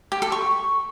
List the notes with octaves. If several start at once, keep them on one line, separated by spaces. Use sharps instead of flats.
G4
A4
C#6